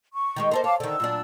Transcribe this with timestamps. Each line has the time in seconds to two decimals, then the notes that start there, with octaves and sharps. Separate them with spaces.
0.13 C#6
0.36 D#3 G#3 G4
0.51 A#3 A4 C5 D#5 C6
0.64 C#5 F5 A5 D6
0.80 D3 D#3 E6
1.00 A#2 F#3 D4